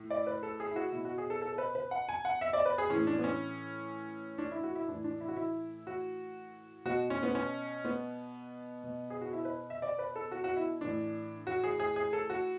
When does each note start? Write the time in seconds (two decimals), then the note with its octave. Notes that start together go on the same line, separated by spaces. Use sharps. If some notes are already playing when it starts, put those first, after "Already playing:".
Already playing: A2
0.10 D5
0.27 B4
0.43 A4
0.60 G#4
0.71 E4
0.76 F#4
0.92 B2 E4
1.05 F#4
1.18 G#4
1.30 A4
1.42 A4
1.53 A4
1.58 B4
1.75 B4
1.91 F#5
2.09 G#5
2.25 F#5
2.41 E5
2.53 D5
2.65 B4
2.78 G#4
2.90 A2 E3 C#4
3.07 D4
3.18 B3
3.24 C#4
4.38 D4
4.51 E4
4.63 F#4
4.75 E4
4.88 A2 E3 D4
5.04 D4
5.20 E4
5.28 F#4
5.36 E4
5.87 F#4
6.85 B2 F#4
7.10 C#4
7.23 B3
7.35 C#4
7.85 B3
8.84 B2
9.10 G#4
9.21 F#4
9.33 E4
9.45 B4
9.70 E5
9.82 D5
9.99 B4
10.16 A4
10.32 F#4
10.44 F#4
10.56 E4
10.81 A2 E3 D4
11.47 F#4
11.64 G#4
11.80 G#4
11.96 G#4
12.13 A4
12.30 F#4